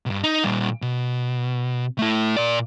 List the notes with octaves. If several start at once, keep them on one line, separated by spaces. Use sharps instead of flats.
B1 G2
D#4
A#2 G3
B2
A3 E4
A#2 D5